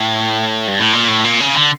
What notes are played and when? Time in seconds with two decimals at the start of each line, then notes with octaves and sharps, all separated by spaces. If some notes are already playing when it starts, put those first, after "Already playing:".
Already playing: A2
0.68 G2
0.80 A2
0.93 A#2
1.08 A2
1.24 A#2
1.40 C#3
1.55 D3